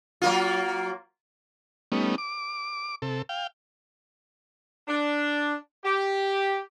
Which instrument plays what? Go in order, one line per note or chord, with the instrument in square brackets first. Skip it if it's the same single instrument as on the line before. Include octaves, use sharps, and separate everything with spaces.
[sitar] F#3 A#3 F4
[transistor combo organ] G3 A3 B3 C#4 D#4
D6
C3 A4
F5 G5
[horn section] D4
G4